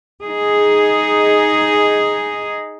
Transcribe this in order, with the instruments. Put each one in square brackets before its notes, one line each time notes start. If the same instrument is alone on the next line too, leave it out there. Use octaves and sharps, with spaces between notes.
[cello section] D#4 G#4